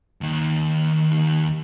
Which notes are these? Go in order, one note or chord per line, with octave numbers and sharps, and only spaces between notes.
D#2 D#3